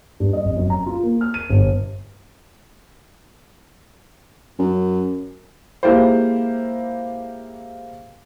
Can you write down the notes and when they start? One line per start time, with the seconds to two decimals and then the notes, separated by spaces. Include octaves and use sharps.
0.20 G2
0.33 D#5
0.45 F1
0.57 F#2
0.70 A#5
0.86 F4
1.03 A#3
1.21 F6
1.34 D#7
1.50 G1
4.59 F#2
5.83 G#3 A#3 E4 F4 G4 C5